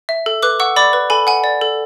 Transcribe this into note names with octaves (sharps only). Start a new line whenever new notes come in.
E5
A4
B4 D6 F#6
F#5 C#6 E6
D5 B5 D6
B4
A4 G#5 B5
F#5 G#5
D5
A4